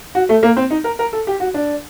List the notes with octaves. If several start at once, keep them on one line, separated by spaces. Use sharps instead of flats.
F#4
A3
A#3
C4
D#4
A#4
A#4
A4
G4
F#4
D4